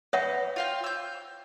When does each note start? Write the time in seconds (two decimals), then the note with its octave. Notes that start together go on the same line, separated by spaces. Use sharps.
0.13 B3 C#5 E5 F#5
0.56 F4 F5 G5
0.84 E6 G6